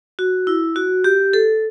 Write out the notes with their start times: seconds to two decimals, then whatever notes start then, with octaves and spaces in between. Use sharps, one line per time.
0.19 F#4
0.47 E4
0.76 F#4
1.04 G4
1.33 A4